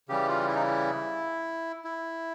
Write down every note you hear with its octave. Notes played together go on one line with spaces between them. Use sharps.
C#3 E3 G3 G4
F4
E4
D#4
E4
E4